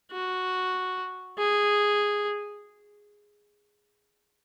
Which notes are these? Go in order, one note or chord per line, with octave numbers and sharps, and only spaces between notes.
F#4
G#4